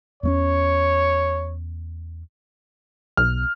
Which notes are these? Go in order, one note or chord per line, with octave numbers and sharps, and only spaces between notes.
E2 A3 C#4 C#5
B1 F6